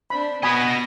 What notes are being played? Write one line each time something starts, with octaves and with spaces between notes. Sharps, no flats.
C4 D4 C5 B5
B3 F#4 D#5 G#5 B5 D#6 A#6